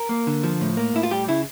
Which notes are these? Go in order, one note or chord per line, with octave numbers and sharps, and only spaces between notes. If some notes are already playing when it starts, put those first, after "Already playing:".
Already playing: A#4
A#3
D3
F3
A2
A#3
A2 E4
F4
G3 G4
C#3 E4